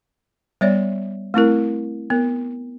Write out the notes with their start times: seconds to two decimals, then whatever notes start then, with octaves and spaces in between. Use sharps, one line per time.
0.61 G3 B3 C#5 D5 E5
1.34 A3 C4 E4 A#4
2.10 B3 A#4